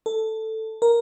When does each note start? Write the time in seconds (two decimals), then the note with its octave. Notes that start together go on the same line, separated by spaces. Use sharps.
0.06 A4
0.82 A#4